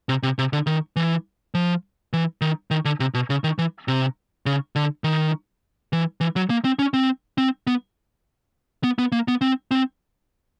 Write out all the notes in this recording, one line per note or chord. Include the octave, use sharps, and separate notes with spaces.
C3
C3
C3
D3
D#3
E3
F3
E3
D#3
D#3
D3
C3
B2
C#3
D#3
E3
C3
C#3
D3
D#3
E3
E3
F#3
A#3
C4
C#4
C4
C4
B3
B3
B3
A#3
B3
C4
C4